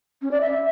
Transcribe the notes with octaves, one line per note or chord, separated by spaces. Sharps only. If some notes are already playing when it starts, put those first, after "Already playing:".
C#4
D5
E5